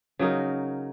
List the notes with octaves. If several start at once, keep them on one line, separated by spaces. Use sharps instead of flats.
C#3 F#3 D#4 A#4